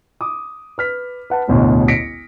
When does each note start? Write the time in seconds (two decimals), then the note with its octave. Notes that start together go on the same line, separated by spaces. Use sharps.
0.21 D6 D#6
0.78 B4 F6 B6
1.30 B4 F#5 A5
1.48 E1 A1 D2 B2
1.88 A#6 B6 C#7 D7